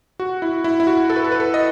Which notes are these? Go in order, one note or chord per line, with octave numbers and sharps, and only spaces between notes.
F#4
E4
E4
E4
F#4
A4
B4
A4
B4
A4
D#5